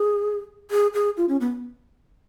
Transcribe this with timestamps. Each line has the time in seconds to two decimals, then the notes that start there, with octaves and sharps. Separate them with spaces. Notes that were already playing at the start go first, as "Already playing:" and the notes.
Already playing: G#4
0.71 G#4
0.94 G#4
1.17 F4
1.29 C#4
1.41 B3